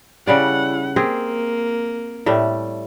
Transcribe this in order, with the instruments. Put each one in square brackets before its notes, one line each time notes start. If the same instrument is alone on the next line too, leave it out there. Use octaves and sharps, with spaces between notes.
[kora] C#3 G3 D5 [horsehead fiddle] E4 F#5
[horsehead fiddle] A#3 [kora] C4 G4 G#4
[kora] A2 G3 A3